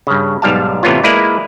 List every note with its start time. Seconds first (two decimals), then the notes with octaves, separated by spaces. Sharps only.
0.07 G2 C#3
0.42 B1 G#2 G3 F5 A5
0.83 A2 C3 E3 B3 C#4 F4
1.03 G#3 A#3 E4 B4 D5